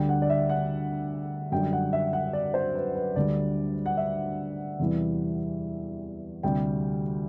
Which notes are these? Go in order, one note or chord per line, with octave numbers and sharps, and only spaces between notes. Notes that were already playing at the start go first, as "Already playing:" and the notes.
Already playing: D2 D3 G3 G5
F#5
D5
E5
F#5
F#2 D3 G3 G5
F#5
E5
F#5
D5
C5
B4
B4
D2 D3 G3 D5
F#5
E5
E2 C3 E3 G3
D2 C3 G3 G5